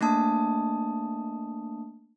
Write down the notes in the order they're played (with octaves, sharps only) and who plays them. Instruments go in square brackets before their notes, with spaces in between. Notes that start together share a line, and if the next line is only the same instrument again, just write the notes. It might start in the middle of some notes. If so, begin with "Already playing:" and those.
[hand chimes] A3 A#3 D4 A5 D#6